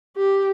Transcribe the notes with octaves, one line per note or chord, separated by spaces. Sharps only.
G4